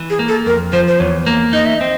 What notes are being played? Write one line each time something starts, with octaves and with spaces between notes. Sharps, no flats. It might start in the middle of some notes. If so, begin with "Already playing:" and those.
Already playing: E3
G#4
A#3
A4
F2 A#4
F3 C5
C5
E2 C#5
A#3
D#4 D#5
E5
C4 D#5